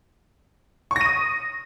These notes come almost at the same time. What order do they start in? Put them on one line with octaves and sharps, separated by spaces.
C#6 A#6 D#7 D#6